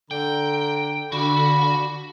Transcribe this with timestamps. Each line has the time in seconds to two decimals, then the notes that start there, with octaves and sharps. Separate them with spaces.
0.11 D3 G5 A#5
1.12 D3 F#4 D5 F5 B5